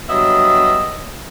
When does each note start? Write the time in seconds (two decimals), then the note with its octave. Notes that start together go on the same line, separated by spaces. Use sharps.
0.09 G2 F#3 B3 D#5 E5